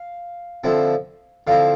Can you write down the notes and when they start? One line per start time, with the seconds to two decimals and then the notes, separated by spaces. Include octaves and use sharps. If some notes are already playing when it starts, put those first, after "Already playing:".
Already playing: F5
0.64 D3 F3 C4 E4
1.47 D3 F3 C4 E4 F5